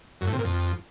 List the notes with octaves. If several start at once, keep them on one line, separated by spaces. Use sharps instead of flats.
F#2
A2
C3
A#2
F2